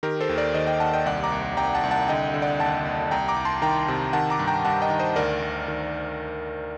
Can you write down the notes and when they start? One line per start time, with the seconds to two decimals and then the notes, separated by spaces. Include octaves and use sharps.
0.03 D#3 G4 A#4
0.21 A4 C5
0.29 D#2
0.38 A#4 D5
0.54 D#3 C5 D#5
0.67 D#5 G5
0.80 D#2 F#5 A5
0.93 D#5 G5
1.06 C2 D5 F#5
1.23 A#5 D6
1.32 C2
1.57 C2 G5 A#5
1.75 F#5 A5
1.83 C2
1.91 F#5 A5
2.08 D3 D#5 G5
2.34 D3
2.42 D5 F#5
2.59 D#2 F#5 A5
2.85 D#2
3.11 C2 G5 A#5
3.28 A#5 D6
3.36 C2
3.45 A5 C6
3.62 D#3 G5 A#5
3.88 C3
4.13 D#3 F#5 A5
4.30 A#5 D6
4.39 G2
4.47 G5 A#5
4.65 G2 F#5 A5
4.82 D#5 G5
4.90 D#3
4.99 C5 D#5
5.16 D2 A#4 D5
5.42 D2
5.68 D#3